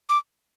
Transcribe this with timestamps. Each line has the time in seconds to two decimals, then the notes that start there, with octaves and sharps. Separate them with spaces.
0.09 D6